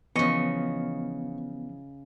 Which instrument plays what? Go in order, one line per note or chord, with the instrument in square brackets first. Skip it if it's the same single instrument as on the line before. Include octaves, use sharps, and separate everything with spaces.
[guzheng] C#3 D#5 [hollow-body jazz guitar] E3 F3 [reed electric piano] B3 [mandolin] C#6